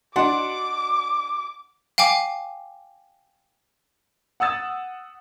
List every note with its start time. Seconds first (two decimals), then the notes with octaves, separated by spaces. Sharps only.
0.16 D4 F#4 D#5 F#5 D6
1.98 F5 G5 G#5 D6
4.40 F#5 D#6 E6 A6